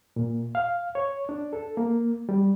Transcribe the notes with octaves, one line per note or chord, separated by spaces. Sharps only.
A#2
F5
C#5
D4
A4
A#3
G3